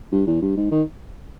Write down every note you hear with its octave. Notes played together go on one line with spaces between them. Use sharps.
G2
E2
G2
G#2
D#3